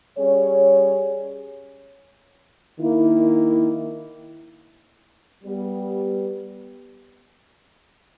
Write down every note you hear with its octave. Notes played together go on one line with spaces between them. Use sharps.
G3 C#4 G#4 C#5
D#3 A#3 E4
G3 B3 G4